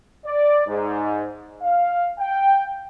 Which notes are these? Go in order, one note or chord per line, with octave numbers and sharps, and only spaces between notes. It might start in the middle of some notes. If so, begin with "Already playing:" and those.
D5
G#2
F5
G5